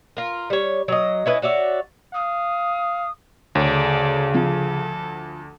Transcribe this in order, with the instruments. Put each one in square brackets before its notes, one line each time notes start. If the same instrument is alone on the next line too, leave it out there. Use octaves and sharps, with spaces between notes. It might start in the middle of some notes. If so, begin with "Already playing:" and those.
[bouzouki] F4 A#4
G3 C#5
F#3 D#5
C#4 E4 B4 D#5
F#4 C#5 D5 E5
[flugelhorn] F5 [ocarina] D#6
[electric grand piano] D2 [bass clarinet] C#3 [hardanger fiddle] A4 D5 [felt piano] C#5
[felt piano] F3 [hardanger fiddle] A4